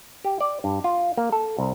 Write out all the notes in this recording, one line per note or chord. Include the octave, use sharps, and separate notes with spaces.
G4
D5
G2
F4
A#3
A4
C2